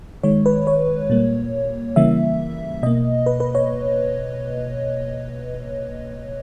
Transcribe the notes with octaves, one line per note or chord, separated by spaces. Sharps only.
D#3 G#3 C#5
B4
C#5
A#2 G3 A#3
C#3 E3 G3 A#3 E5
B2 A#3 D#5
B4
B4
C#5